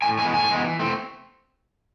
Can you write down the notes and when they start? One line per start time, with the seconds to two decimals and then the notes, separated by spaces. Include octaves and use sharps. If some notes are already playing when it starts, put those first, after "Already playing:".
0.02 A2 G#5
0.18 E3 G#3 B3 G#5
0.33 A2 G#5
0.49 E3 G#3 B3
0.64 E3
0.79 A3 C4